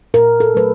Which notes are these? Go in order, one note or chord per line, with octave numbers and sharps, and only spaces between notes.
A#2 A#4
A4
F#3 A3 B4